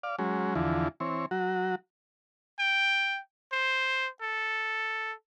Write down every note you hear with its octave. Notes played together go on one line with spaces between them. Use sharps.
D5 F5
F#3 G#3 C#4
E2 D3 E3 F3
E3 C4 C#5
F#3 F#4
G5
C5
A4